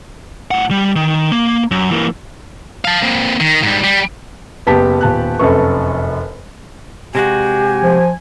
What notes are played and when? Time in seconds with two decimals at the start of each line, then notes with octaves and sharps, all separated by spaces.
0.51 A2 F#5
0.71 G3
0.96 D#3
1.32 A#3
1.71 F#2
1.91 E3 A#3
2.85 F5 A5
3.03 A#3 C4
3.40 D#3
3.63 G#2 G3
3.84 G3
4.67 F#1 B3 G4 A5 B6
5.01 D#1 A5 F#6
5.39 F1 F#2 A4 B4 C#6
7.15 C3 G#3 F#4 G4 G#5
7.83 F3